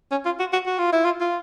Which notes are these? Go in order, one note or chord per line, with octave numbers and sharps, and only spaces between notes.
C#4
F4
F#4
F#4
F#4
F4
E4
F4
F4